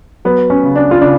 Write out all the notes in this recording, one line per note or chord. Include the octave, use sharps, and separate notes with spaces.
F#3 B3
C#4
C#3
D4
F4
C#3 D4